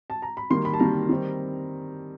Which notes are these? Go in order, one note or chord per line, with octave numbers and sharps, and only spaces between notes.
A5
A#5
B5
D#3 G3 A#3 C6
B5
A5
D#3 G3 A#3 A#5
D#3 G3 C4